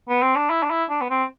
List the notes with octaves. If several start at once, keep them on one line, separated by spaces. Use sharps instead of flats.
B3
C4
D4
E4
D4
E4
D4
B3
C4